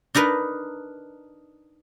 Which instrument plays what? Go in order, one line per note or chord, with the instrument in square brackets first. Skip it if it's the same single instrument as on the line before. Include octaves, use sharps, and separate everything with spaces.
[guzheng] D4 D#4 A#4 B4